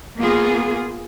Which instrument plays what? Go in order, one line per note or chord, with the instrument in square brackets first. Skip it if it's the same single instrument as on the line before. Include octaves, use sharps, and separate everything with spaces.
[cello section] A#3 B3 F4 G#4